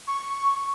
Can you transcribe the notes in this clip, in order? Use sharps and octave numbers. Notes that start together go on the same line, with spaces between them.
C#6